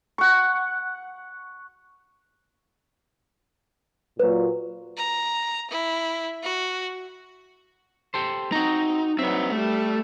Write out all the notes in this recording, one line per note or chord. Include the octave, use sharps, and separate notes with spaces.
F#5 C#6
A#2 F#3 B4 C5
A#5
E4
F#4
G4 A4 C5
C4 D#4 F#4 A#5
F#3 C4 D#4 B4 E5
G3 A3 A4